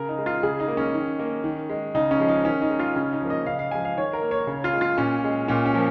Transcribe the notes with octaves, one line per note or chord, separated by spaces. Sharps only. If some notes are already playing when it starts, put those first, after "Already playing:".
Already playing: C#3 A#4
D#4
G#3
F4
C#3 G#4
D#4
A#3
C#4
D#3
A#3
D#3
G#3
C#3 D#4
C#4
F3 G#3
D#4
D#3 C#4
D#4
G#3
F4
C#3 C#4
D#4
F3 A#3
D#5
C#3 F5
F5
F3 G#3 G#5
F5
D#3 C#5
A#4
A#3
C#5
C#3
F4
G#3
F4
A#2 C#4
G#3
A#2 C#4
C#4
F3 A#3